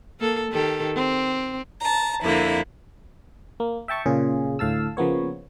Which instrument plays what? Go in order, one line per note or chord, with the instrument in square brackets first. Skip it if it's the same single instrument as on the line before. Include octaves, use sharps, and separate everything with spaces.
[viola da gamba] A#3 A4
D#3 G4 A4
C4
[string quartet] A5 A#5
F2 D3 A#3 E4
[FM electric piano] A#3
E5 G5 A5 C#6
A#2 C#3 F4 G#4
D2 A2 F5 A5 E6
C#3 F3 A#3 B3 C#5